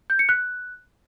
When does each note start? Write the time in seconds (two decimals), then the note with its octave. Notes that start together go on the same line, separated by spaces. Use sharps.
0.10 G6
0.19 C#7
0.29 F#6